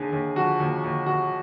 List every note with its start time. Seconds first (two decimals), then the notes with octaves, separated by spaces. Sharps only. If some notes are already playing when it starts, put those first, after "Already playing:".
Already playing: D#2 D3 G#4
0.13 D#2
0.36 F3 F#4
0.60 D#2
0.84 D#2
1.06 D#2 F#4